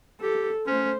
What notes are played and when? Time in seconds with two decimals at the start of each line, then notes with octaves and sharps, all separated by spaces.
0.21 G4 A4
0.67 A3 C#4 C5